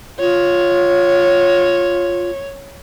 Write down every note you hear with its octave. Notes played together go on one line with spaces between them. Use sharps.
F4 C#5